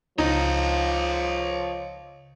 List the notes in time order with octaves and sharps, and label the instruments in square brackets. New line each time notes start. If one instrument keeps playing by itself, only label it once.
[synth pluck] C#2 [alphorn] F3 [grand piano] D#4 [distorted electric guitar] C#5 D#5